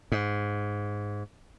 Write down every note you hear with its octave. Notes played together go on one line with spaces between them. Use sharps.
G#2